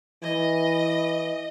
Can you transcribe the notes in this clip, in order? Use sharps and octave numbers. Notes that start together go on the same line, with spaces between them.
E3 D#5